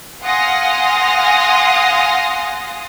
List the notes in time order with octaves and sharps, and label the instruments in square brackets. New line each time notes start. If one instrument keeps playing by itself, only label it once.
[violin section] F5 F#5 G#5 C6 D#6 A#6